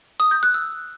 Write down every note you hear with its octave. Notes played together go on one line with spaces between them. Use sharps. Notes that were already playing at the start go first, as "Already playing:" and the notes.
D#6
G6
F#6
E6